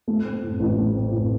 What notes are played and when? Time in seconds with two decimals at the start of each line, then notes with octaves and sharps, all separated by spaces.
0.08 A3
0.25 C4
0.43 A2
0.60 A1
0.78 A3
0.95 C4
1.12 A2